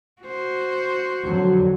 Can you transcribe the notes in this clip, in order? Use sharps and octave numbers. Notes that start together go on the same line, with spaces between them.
F#4 C5
F2 D3 F#3